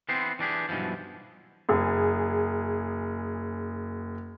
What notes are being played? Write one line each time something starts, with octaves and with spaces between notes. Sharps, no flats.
E3 B3 C4 C5
E3 D4 G4 G#4
B1 G2 B2 E3 F3
F#1 G#4